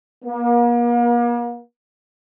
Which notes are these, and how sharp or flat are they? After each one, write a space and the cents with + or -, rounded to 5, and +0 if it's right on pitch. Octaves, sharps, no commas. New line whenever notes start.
A#3 +40